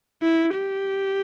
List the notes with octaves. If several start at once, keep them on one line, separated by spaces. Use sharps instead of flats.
E4
G4